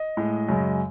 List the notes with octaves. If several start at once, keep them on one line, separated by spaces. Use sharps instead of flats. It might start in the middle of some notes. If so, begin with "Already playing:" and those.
Already playing: D#5
A2 G#3
F#2 C#3 G#3